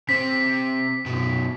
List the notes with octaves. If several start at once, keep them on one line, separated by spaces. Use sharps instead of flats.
C3 C4 B6
F#2 B2